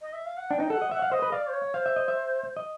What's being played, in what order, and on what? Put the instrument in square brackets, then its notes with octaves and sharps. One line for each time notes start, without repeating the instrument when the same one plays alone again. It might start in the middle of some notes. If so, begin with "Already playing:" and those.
[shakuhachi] D#5
E5
F5
F#5
[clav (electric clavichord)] D4 [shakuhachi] G5
[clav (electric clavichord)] D#4
[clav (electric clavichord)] A4 [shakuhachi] F#5
[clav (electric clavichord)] D#5
[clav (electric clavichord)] E5 [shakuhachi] F#5
[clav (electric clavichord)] F5
[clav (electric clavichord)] C5 [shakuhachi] D#5
[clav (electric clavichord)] B4
[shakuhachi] D5 [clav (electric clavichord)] F5
[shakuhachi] C5
C#5
[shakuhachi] C5 [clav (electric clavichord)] F5
[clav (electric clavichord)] E5
D#5
E5
D#5